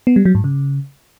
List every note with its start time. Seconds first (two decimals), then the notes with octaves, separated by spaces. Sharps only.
0.07 B3
0.16 G3
0.25 F#3
0.35 G#2
0.44 C#3